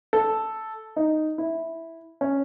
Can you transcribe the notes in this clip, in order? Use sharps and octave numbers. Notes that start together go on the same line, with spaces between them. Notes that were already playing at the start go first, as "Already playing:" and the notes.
A4
D#4
E4
C#4